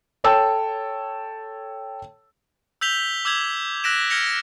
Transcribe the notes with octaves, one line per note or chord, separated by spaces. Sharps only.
A4 C#5 G5 A5 E6
E6 G6 B6 F7 G7
D6 E6 G6 G#6 F7
E6 F#6 A#6 B6 D7 E7
F6 G#6 A#6 C#7 F7